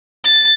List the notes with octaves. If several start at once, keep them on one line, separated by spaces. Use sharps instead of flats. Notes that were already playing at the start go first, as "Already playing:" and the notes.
A6